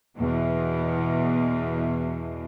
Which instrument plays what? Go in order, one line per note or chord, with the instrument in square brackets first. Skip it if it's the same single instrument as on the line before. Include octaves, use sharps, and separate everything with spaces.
[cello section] E2 B2